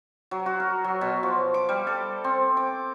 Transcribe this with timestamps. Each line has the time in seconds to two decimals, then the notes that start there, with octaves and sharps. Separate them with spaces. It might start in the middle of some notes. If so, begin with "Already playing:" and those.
0.31 F#3
0.46 F#4
0.60 A#4
0.84 F#3
1.01 B2
1.23 F3
1.54 D6
1.69 G3
1.87 A4
2.24 C4
2.57 D6